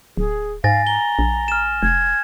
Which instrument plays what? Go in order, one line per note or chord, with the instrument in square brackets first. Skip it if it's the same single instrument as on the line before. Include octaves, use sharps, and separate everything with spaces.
[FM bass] D1 [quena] G#4
[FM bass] G#2 [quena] F5 [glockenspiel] G#5 A6 A#6
[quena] A#5 [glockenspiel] G7
[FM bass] A#1
[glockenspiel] F6 E7
[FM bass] F1 [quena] G#6